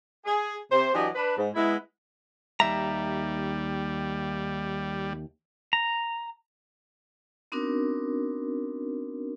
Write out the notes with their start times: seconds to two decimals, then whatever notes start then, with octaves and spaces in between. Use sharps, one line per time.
0.25 G#4
0.71 C3 C5
0.94 E3 F#3 D4 G4 D#5
1.15 D4 B4
1.37 G#2
1.54 G#3 B3 E4
2.60 D#2 G3 E5 A#5
5.73 A#5
7.52 B3 C4 D4 D#4 F#4 A#4